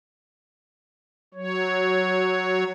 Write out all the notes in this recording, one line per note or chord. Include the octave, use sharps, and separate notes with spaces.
F#3 C#5